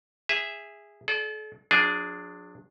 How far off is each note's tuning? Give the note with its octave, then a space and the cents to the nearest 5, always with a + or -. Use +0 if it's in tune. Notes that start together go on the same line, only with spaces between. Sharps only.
G#4 -15 E5 +0
A4 -40 D5 +0
F#3 -45 D4 +0 G#4 +0